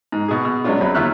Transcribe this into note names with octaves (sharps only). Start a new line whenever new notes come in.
G#2
B2 G#4
B2
F#3 G#3 B3 C#4 D4 F4
F#2 F#3 C4 B5
D#2 F4 E5 F6 F#6